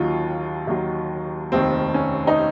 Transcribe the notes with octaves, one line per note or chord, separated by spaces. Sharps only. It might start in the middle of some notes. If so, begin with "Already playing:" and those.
Already playing: D#2 D#3 F#3 F4
D#2 D#3 F#3
F1 D#2 D#3 C4
C#4
D#4